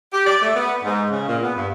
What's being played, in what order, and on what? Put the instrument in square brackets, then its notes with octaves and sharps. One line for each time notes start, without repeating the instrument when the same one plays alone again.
[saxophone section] G4
D5
A3
B3
G#2
C#3
A#2
B3
G2